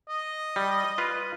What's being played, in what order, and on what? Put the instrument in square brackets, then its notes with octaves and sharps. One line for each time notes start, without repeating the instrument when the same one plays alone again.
[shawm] D#5
[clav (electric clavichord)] G3
F4 B4